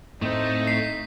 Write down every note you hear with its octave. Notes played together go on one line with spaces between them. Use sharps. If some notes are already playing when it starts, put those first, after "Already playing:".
A2 A3 C4 D#4 C5
B6 C7